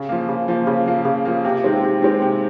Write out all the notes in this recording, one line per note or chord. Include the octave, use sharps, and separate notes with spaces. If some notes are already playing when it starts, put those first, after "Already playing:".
Already playing: C#3
F3 A#3
C#3
F3 A#3
C#3
F3 A#3
C#3
F3 A#3
C3
D#3 G#3 C4
C3
D#3 G#3 C4
C3